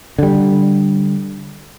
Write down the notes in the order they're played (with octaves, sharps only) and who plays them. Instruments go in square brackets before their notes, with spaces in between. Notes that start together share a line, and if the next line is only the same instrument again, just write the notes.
[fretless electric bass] D3 G3